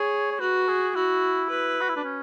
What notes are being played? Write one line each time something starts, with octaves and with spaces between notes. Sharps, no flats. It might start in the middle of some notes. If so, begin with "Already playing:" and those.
Already playing: G#4 C#5
C#5
F#4 B4
G#4
E4 F#4
B4
F#4
E4
D4
C#4